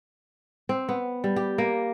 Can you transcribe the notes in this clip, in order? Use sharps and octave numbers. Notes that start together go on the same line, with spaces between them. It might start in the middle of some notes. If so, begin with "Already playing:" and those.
C4
B3
G3
G4
A#3